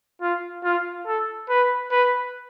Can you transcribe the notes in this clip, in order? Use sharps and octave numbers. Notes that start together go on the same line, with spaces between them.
F4
F4
A4
B4
B4